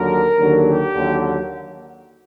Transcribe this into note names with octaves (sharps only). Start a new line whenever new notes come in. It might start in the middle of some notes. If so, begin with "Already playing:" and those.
Already playing: D#2 D3 F#3 A#4
D#2 D3 F#3
G4
D#2 D3 F#3